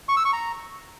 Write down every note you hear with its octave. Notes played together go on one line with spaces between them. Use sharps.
C#6
E6
C#6
A#5